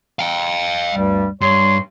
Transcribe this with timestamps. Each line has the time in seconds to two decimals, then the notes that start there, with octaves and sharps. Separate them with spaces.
0.19 F5 G5
0.93 D2 G2 G3
1.41 G2 C#5 C6